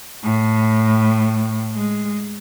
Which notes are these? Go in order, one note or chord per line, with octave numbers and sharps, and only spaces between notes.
A2
G#3